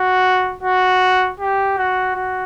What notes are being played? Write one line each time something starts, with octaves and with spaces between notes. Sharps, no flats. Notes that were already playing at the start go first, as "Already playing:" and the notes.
Already playing: F#4
F#4
G4
F#4
F#4